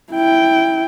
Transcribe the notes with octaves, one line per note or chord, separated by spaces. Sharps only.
E4 G5